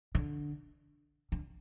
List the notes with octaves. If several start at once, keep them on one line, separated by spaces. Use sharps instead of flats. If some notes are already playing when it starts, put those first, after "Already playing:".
D3
D3